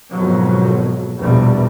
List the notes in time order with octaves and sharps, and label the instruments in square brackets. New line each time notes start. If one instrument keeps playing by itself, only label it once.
[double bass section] G#1 F2 B2 F#3
A#1 E2 B2 G3